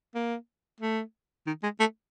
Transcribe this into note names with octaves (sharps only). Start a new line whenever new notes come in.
A#3
A3
D#3
G#3
A3